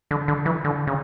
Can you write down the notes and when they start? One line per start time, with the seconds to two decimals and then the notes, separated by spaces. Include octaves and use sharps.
0.11 D3
0.28 D3
0.46 E3
0.64 D3
0.87 C#3